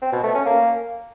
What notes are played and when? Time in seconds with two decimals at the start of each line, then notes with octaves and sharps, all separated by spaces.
0.02 C4
0.13 B2
0.24 A3
0.35 C#4
0.46 A#3